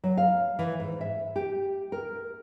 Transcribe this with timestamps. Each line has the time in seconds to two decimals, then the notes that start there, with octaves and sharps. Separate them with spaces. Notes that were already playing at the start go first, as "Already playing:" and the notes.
0.04 F#3
0.17 F5
0.59 E3
0.80 G#2
1.01 E5
1.36 G4
1.92 A#4